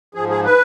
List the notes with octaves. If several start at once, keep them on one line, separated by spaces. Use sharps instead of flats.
G#2 F3 G#4
G#4
B4